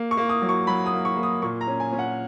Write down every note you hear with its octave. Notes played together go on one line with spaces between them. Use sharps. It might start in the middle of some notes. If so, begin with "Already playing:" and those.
Already playing: A#3
C#6
A#3
D#6
F#3
C#6
F#3 B5
D#6
A#3
C#6
A#3
D#6
A#2 C#6
A#5
C#4
G#5
C#4
F#5